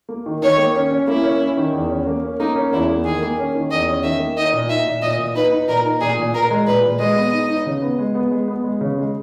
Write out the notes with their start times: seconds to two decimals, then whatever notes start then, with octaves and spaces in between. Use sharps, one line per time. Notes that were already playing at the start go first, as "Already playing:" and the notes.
0.09 A#3
0.26 D#3
0.42 D#3 C#5
0.58 A#3
0.75 C#4
0.91 C#4
1.08 A#3 E4
1.24 C#4
1.41 C#4
1.57 D#3
1.73 E2
1.90 C#4
2.07 A#3
2.23 C#4
2.40 A#3 D#4
2.56 C#4
2.72 E2 E4
2.89 A#3
3.05 D#3 G#4
3.22 A#3
3.38 C#4
3.55 D#3
3.71 E2 D#5
3.88 C#4
4.03 D#3 E5
4.20 A#3
4.37 D#4 D#5
4.53 A#2
4.69 D#4 E5
4.87 A#2
5.02 A#2 D#5
5.19 A#2
5.35 D#4 B4
5.51 D#4
5.68 A#2 A#4
5.84 D#4
6.01 A#2 G#4
6.18 A#2
6.34 A#2 A#4
6.51 G#3
6.67 A#2 B4
6.83 A#2
6.99 G#3 D#5
7.16 B3
7.33 D#4
7.49 D#4
7.66 C#3
7.82 B3
7.99 G#3
8.15 B3
8.31 G#3
8.48 B3
8.64 G#3
8.81 C#3
8.98 G#3